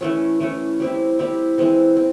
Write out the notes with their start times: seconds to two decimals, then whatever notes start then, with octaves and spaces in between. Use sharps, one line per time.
0.01 E3 A3 C#4
0.40 E3 A3 C#4
0.80 G3 C4 E4
1.19 G3 C4 E4
1.58 E3 G#3 C4
1.97 C4